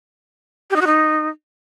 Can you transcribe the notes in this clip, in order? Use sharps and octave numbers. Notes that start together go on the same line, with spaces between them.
G4
D#4
F#4
D#4